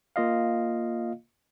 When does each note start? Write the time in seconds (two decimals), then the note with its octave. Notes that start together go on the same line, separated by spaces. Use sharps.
0.16 A#3 F4 D#5 F5